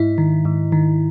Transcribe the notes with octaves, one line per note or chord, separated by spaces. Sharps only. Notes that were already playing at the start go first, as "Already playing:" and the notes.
Already playing: G#2 E4
D#3
G#2
D#3